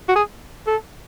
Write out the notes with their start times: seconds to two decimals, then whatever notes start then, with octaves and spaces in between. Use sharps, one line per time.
0.09 F#4
0.16 G#4
0.67 A4